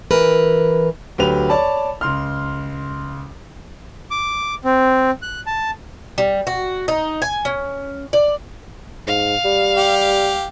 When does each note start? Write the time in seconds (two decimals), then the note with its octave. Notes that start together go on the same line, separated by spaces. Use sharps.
0.11 E3 A#4 B4
1.18 D2 F#3 G4 B4 F7
1.49 C#5 D5 A5 B5
2.01 C#2 C6 F6
4.11 D6
4.64 C4
5.22 F#6
5.47 A5
6.18 G3
6.47 F#4
6.88 D#4
7.22 G#5
7.45 C#4
8.13 D5
9.07 G#2 F5
9.45 G3
9.77 G4